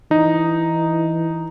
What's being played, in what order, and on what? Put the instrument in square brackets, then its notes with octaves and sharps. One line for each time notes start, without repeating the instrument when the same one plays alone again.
[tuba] E3 [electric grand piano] D#4